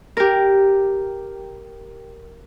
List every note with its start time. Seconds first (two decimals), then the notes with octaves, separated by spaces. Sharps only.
0.17 G4 A#4